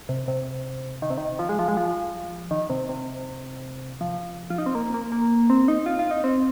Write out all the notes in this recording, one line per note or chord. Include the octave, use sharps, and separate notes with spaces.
C3
C3
D#3
C3
D#3
F3
G#3
F3
G#3
F3
D#3
C3
C3
F3
F4
D#4
C4
A#3
A#3
A#3
C4
D#4
F4
F4
D#4
C4